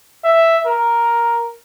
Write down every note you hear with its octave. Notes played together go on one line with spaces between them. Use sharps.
E5
A#4